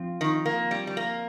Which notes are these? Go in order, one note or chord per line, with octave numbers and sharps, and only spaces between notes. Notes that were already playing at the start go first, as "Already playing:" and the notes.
Already playing: F3 C4 F4
D#3
A#3
G3
G3
A#3